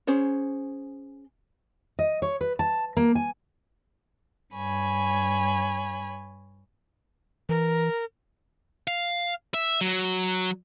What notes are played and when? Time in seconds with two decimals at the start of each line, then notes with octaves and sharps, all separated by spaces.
0.07 C#4 G#4 C5 C#5
1.99 D#5
2.22 C#5
2.41 B4
2.59 A5
2.97 A#3
3.15 G#5
4.55 G2 C#5 G#5 B5
7.49 E3 A#4
8.87 F5
9.54 E5
9.81 F#3